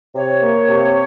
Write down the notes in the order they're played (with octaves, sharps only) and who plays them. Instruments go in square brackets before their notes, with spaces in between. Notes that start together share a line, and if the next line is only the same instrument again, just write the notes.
[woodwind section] C3 C#5
A#3
C3